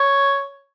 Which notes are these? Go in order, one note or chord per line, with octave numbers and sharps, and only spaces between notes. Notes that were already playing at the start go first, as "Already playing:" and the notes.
Already playing: C#5